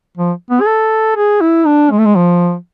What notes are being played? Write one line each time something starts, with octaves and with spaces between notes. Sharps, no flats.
F3
B3
G#4
A4
G#4
E4
D4
G#3
A3
G#3
F3